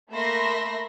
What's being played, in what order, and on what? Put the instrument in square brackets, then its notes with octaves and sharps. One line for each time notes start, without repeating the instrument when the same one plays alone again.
[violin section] A3 A#3 E5 B5 C6 A#6